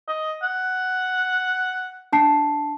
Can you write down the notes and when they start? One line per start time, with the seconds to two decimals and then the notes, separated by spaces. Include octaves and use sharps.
0.08 D#5
0.42 F#5
2.12 D4 A5 C7